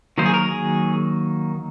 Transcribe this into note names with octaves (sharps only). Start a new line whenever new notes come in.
D#3 F#3 A#3 D#4 C5
G#4
A#4
G#4